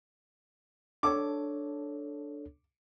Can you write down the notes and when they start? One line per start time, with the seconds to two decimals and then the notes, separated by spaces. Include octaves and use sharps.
1.03 D4 A4 C#5 D6